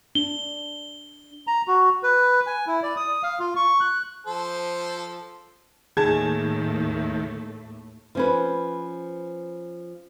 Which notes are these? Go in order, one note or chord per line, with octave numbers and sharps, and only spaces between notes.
D4 G7
A#5
F#4
B4
G#5
E4
D5
D#6
F5
F4
C#6
F#6
F3 A4 C5
D#2 A2 D#3 A3 G#4 A5 G#6
F3 C#4 B4